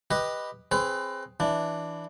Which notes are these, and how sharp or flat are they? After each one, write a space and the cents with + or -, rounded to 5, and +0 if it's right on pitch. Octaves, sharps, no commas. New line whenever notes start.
G4 +5 B4 +0 D#5 +0
C4 +20 G#4 +0 B4 +30
E3 +0 D4 +0